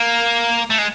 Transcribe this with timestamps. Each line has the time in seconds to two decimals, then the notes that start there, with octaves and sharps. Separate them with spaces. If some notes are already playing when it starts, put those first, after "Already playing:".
Already playing: A#3
0.70 A3
0.78 G#3